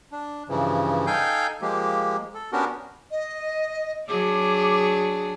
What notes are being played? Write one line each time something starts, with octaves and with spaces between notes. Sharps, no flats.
D4
G2 C#3 E3 F3
D#4 A4 F5 G5 G#5 G6
F3 G#3 A#3 G4
A4
B3 C#4 D4 F#4 G4 A#4
D#5
F#3 D4 G#4 D6